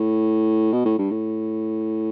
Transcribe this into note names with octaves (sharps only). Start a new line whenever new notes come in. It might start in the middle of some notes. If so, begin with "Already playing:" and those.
Already playing: A2
B2
A2
G2
A2